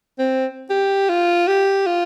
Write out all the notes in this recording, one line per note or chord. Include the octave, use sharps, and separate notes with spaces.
C4
G4
F4
G4
F4